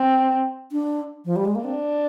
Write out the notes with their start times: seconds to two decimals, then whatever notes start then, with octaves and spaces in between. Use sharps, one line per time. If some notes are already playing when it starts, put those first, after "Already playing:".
Already playing: C4
0.72 D4
1.25 F3
1.36 G3
1.45 G#3
1.55 A#3
1.64 C4 D4